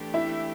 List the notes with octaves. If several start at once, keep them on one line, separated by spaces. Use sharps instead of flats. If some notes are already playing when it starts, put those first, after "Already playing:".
Already playing: E3 A3 D4 G4
E4 E5